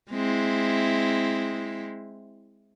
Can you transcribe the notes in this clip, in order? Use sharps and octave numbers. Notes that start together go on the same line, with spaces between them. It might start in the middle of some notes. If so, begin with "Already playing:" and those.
G#3 C4 E4